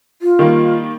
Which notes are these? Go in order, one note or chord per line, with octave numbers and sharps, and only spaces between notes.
F4
D#3 G3 A#3